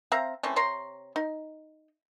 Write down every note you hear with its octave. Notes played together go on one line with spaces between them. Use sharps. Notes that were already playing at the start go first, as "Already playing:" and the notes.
C4 E5 F5 A#5
E3 A3 C4 C#4
C3 C#5 A#5 C6
D#4